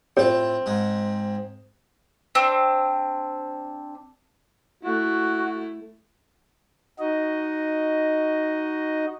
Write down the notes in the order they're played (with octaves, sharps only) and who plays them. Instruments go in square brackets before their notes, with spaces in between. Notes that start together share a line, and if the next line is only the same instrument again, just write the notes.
[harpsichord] A2 F4 [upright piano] C4
[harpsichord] G#2 G#3
[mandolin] C4 D4
[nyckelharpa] A3 E4 [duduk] F#4
[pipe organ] D#4 F#4 D#5